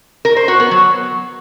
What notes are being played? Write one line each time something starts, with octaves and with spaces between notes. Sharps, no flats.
A#4
C5
F#4
B3
F#3